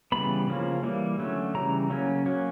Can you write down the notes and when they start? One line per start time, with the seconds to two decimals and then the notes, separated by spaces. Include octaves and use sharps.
0.12 C#3 E3 G3 B3 B5
0.48 C#3 F3 A#3 C#4
0.83 E3 G3 A#3
1.18 D3 F#3 A3 C#4
1.54 C#3 E3 G3 A#5
1.90 C#3 F#3 A#3 C#4
2.26 F#3 A#3 C#4